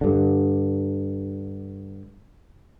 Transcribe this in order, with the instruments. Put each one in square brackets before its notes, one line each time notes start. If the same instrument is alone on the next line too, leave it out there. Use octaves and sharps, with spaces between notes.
[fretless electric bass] G2 D3